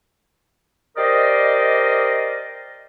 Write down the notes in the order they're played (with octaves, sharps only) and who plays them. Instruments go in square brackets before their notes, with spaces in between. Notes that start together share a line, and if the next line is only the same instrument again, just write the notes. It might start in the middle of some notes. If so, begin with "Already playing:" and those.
[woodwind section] G4 A#4 C5 D5 D#5